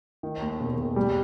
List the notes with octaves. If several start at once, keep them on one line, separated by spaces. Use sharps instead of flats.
D#3
D#2
E1
E1
G3